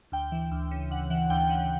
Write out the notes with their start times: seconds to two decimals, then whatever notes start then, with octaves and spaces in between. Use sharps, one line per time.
0.12 D2 G5
0.32 E3
0.51 D2
0.71 C#3
0.91 D2 F#5
1.10 E3 F#5
1.30 D2 G5
1.49 C#3 F#5